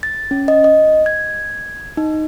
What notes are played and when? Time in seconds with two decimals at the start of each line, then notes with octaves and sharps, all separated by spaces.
0.03 A6
0.31 C#4
0.48 D#5
0.64 D#5
1.06 G#6
1.97 D#4